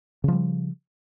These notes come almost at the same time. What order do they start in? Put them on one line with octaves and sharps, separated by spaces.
C#3 F3 G3